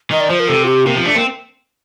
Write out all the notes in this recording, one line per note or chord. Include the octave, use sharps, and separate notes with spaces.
D#3 D#5
D5
F3 C5
A#4
C3 A4
F4
G4
C3 A#3
F3 C4
A3 D4
A#3 C4